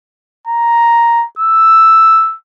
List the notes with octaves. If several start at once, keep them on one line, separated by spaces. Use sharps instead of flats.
A#5
E6